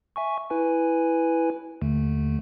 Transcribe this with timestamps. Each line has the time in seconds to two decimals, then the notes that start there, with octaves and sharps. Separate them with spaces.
0.16 E5 G#5 C#6
0.50 E4 B4 G#5
1.81 D#2 D3 A3